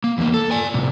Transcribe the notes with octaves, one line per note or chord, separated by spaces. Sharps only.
A#3
E2 A#3
A4
D5 G#5
A2 C3